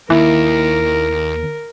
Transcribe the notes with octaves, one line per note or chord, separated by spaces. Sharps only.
D#2 E4 A#4